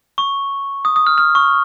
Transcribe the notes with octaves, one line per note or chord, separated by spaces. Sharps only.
C#6
D#6
D#6
F6
F6
C#6